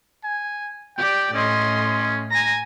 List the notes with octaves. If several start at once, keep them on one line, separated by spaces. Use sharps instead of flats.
G#5
G4 D5 G5
A2 C#4 D#5 C6
G#5 A#5 A#6